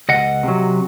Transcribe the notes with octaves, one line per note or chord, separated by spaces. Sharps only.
C#2 D#5 F#5
C3 F#3